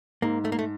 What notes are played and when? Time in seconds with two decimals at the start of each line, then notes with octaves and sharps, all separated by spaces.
0.22 G#2 A#3
0.45 A3
0.52 A#3
0.59 A3